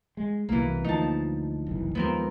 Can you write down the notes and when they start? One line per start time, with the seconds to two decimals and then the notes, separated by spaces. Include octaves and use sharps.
0.17 G#3
0.49 C2 B2 E3 A#3
0.84 D2 F3 D#4 A5
1.67 F#1 C2 E3
1.95 D#2 F3 G#3 B3 C4 A#4